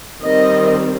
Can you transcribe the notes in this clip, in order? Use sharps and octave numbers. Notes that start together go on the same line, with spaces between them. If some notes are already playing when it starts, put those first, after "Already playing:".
D#3 G3 C4 D#5